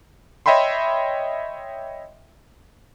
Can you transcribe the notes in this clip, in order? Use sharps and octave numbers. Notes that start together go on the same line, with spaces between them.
C#5 D#5 E5 G5 B5 C6